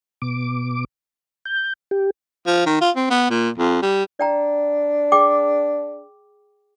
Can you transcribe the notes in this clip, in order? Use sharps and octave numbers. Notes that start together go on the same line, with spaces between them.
B2 D6
G6
G4
F3
D#3
F4
C4
B3
A#2
F2
G3
D4 D5 G5 A#5
G#4 G5 D6